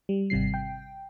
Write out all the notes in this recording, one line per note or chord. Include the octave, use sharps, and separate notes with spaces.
G3
G#1 C3 G3 C7
G5